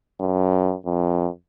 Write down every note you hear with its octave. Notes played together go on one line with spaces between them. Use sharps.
F#2
F2